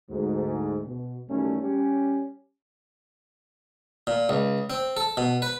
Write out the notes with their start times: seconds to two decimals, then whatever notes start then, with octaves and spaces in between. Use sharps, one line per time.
0.10 D2 G#2
0.87 B2
1.30 A1 F#2 D#3 G3 A3 C#4
1.63 G3 C#4 G4
4.07 A#2
4.29 C#2
4.70 C4
4.97 A4
5.17 B2
5.42 B4